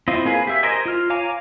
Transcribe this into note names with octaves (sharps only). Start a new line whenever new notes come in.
C4 E4 F4 D#5
A#3 G#4 B4
G4 E5
A#4 C5 D#5 G#5
F4 F6
C#5 F5 G#5 A#5 D6